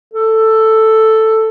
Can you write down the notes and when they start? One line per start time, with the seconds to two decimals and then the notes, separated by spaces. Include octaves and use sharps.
0.13 A4